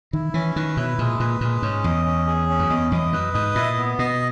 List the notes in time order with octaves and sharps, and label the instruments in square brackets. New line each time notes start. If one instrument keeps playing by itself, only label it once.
[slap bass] D#3 [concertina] E4
[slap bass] E3 [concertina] C#4
[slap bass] D#3 [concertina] B4
[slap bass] B2 [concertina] E4
[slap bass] A#2 [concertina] G#3
[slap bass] A#2 [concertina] B4
[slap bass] A#2 [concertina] G#3
[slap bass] G#2 [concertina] C#4
[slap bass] E2 [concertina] D#5
[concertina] C#4
G#4
C#4
[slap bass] F#2
[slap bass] E2 [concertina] D#5
[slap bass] E2 [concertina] D#5
[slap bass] F#2 [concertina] B4
[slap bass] G#2 [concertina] D#5
[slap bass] A#2 [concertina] E4
[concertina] B3
[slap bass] B2 [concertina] D#5